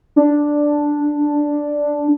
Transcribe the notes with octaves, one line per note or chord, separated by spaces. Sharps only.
D4